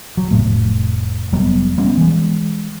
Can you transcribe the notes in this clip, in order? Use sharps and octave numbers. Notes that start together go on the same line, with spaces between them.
F#3
F1 A2 A3
F1 F#3 G3 B3
G3 B3 C#4
E3 G#3